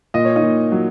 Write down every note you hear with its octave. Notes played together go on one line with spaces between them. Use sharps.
A#2 D#5
C#5
D#4 D#5
A#2
F#3